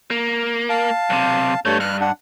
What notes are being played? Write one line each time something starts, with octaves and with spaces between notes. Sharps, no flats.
A#3
F5 A5
B1 C3
G2 G3 A3 C#5
G2 F6 F#6
D4 F#5